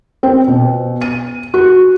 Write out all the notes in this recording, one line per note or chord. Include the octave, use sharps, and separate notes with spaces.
C4
B2
D#7
F#4